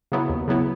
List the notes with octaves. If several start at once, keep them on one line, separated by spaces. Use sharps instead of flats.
C#3 F#3 B3 E4
D#2
C#3 F#3 B3 E4